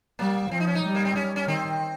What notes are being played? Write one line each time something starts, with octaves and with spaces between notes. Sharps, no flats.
G3 A#3
F3 C4
D#4
C#4
D#4
G3
A#3
C4
C#4
C#4
D#3 C4